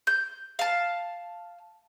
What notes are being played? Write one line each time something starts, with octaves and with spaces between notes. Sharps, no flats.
G6
F5 A5